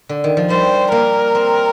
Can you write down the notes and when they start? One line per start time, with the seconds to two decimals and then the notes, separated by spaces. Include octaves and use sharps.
0.09 D3
0.24 D#3
0.37 F3
0.50 G3 C5
0.92 A#3 A#4
1.35 C4